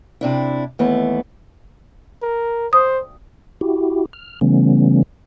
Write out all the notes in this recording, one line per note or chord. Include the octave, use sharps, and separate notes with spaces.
C3 D4 E4
D#2 E3 A3 B3
A#4
C5 D#6
E4 F#4 G4
F6
C#3 E3 G3 A3 B3 C#4